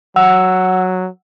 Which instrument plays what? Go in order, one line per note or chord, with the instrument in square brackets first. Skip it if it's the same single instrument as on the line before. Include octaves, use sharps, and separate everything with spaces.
[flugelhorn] F#3 [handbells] F#5 E6